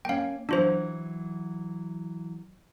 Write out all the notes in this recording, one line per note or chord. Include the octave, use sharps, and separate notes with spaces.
A#3 C#4 F5 G5
E3 F#3 D4 F4 C5